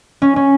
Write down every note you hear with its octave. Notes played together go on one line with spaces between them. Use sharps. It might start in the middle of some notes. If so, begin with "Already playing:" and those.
C#4
C#4